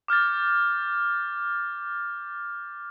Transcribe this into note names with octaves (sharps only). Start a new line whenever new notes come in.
D6 F6 G6 A6